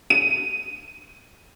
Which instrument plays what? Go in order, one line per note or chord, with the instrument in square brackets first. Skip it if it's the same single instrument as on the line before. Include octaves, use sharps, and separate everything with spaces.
[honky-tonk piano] D#7